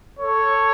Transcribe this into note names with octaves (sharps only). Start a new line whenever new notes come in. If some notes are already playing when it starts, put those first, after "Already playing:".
A4 C#5